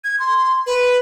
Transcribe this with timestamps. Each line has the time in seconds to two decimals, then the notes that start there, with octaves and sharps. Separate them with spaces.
0.04 G#6
0.19 C6
0.66 B4